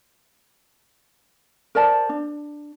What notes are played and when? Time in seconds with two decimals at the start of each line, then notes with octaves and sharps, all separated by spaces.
1.75 A#4 C5 D5 A5
2.09 D4